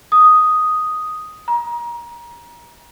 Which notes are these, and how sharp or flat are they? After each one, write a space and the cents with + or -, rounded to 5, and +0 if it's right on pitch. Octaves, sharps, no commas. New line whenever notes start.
D#6 +0
A#5 +25